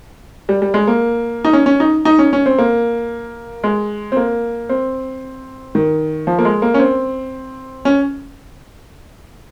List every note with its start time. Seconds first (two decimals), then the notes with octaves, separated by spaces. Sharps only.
0.49 G3
0.62 G3
0.74 G#3
0.87 A#3
1.45 D#4
1.53 C#4
1.66 C#4
1.80 D#4
2.05 D#4
2.19 C#4
2.33 C#4
2.46 C4
2.58 A#3
3.64 G#3
4.12 C4
4.17 A#3
4.69 C4
5.75 D#3
6.27 F3
6.39 A#3
6.45 G#3
6.62 A#3
6.74 C#4
6.79 C4
7.85 C#4